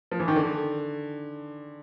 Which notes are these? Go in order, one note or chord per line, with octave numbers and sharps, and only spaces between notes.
F3
E3
D#3
D3